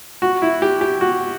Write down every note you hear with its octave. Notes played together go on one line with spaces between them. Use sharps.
F#4
E4
G4
G4
F#4